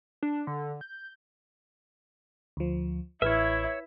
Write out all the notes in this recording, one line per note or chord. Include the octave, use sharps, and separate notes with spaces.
D4
D3
G6
D2 F3
A1 E4 B4 C#5 E5